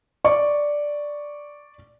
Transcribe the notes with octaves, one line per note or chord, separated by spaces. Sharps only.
D5 C#6